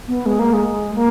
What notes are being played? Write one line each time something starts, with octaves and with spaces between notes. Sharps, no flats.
B3
G#3
A#3
G#3
A#3